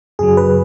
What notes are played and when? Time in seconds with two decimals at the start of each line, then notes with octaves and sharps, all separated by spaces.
0.19 F#2 C#3 F#3 G#4
0.37 B4